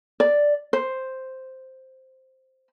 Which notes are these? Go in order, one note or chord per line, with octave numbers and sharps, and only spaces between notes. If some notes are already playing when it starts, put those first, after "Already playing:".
D5
C5